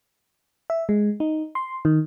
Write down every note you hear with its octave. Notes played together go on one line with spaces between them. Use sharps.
E5
G#3
D#4
C6
D#3